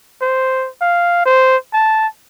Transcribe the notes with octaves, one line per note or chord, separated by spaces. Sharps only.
C5
F5
C5
A5